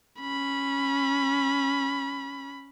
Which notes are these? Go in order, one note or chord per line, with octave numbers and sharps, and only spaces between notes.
C#4 B5